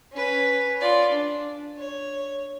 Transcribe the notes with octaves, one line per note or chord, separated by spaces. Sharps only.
C#4 B4
F4 D5
D4
C#5